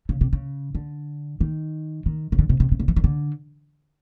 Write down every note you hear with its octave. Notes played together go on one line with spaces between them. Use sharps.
C#3
C3
C#3
D3
D#3
D#3
C#3
D3
C3
C3
C3
C#3
E3
D#3
D3